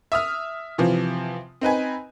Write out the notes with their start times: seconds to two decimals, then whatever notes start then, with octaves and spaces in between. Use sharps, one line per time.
0.12 E5 D#6 F6
0.78 C3 E3 F3
1.61 C4 D#4 B4 G#5